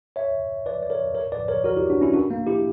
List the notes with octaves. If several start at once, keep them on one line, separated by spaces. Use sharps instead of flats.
C#5 E5
B4 D5
D5
A#4 C#5
A#4 C#5
B4 D5
A#4 C#5
F#4 A#4
E4 G4
D4 F#4
C#4 E4
D4 F#4
A#3
E4 G4